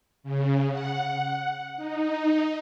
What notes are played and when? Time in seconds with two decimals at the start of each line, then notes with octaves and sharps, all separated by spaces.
0.24 C#3
0.72 F#5
1.77 D#4